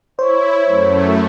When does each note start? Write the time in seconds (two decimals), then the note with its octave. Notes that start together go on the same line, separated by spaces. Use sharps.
0.19 E4 C5 C#5
0.65 F#2 A3